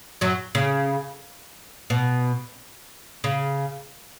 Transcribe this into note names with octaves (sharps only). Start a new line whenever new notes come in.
F#2 F#3
C#3
B2
C#3